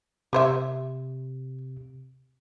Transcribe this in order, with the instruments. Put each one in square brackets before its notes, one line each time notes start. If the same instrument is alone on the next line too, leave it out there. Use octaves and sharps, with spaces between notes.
[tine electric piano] C3 [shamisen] G4 C5 E5